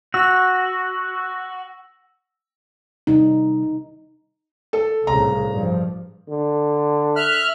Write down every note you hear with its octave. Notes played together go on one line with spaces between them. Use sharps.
F#4 E6 A#6
C3 G3 D#4
A4
C2 A2 C#3 A#5
G2 F3
D3
E5 F6 F#6